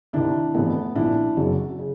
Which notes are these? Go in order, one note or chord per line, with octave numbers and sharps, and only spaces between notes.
C2 C3 D#3 D4 E4
F1 F2 C3 E3 A3 B3
B1 A#2 F3 D4 E4
F#1 F#2 C#3 F#3
C#3